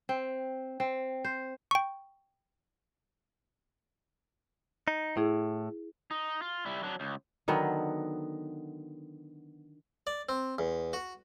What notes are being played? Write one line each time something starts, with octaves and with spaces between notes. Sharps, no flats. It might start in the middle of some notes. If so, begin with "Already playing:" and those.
C4
C4
C5
G5 C#6
D#4
A2 E4 G#4
D#4
F4
G3 E4
F#3 D4
C#2
D3 D#3 F#3 B3
D5
C4
E2
F#4